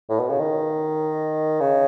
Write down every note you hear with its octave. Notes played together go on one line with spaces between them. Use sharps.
A2
B2
C#3
D#3
C#3